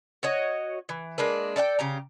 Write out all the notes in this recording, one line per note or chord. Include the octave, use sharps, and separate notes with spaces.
F#4 C#5 D#5
E3
G#3 A#3 D4 B4
A4 D5 E5 G5
C#3 G4 A#5